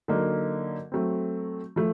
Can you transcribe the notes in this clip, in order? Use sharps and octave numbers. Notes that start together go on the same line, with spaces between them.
D3 F#3 A#3 D#4
F#3 A3 C4
F3 A3